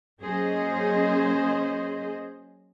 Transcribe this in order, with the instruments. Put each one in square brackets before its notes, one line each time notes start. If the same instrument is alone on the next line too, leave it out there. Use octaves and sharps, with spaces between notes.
[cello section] F#3 A#3 C#4 G#4 C5 D#5